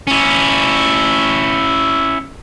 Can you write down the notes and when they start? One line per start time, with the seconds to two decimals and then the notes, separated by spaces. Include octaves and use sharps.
0.07 C#4 E4